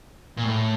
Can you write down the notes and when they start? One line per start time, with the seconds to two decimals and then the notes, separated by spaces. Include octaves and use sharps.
0.37 A#2
0.43 A2